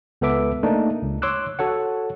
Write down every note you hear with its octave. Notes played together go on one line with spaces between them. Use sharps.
C#2 B3 A4 B4 E5 D6
A3 A#3 D4 D#4
C#2
C#5 C6 D6 E6 F#6
F#4 A4 C#5 F#5